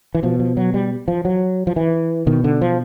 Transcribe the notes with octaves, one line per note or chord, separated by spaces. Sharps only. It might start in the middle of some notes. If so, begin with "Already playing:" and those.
E3
B2 F3
F3
F#3
G3
F3
F#3
F3
E3
B2 D#3
D3
F3